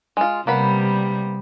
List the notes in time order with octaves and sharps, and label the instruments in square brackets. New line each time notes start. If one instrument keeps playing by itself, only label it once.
[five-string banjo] G#3 F4
[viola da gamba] C3 G3 [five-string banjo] A#3 B3 B5